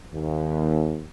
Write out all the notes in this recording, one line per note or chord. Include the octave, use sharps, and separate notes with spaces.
D#2